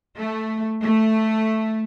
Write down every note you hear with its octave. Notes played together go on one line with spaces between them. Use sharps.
A3
A3